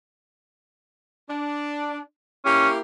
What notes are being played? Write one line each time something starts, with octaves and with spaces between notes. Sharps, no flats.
D4
A#3 C#4 E4 G4